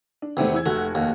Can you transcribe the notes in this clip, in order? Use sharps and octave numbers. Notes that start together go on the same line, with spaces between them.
D4
E2 C3 D#3 A3
E3 E6 G#6
F1 A3 F#4 F#5
D#2